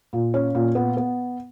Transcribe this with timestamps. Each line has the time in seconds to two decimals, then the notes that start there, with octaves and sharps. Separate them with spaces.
0.13 A#2
0.34 C#4
0.55 A#2
0.75 B3
0.97 B3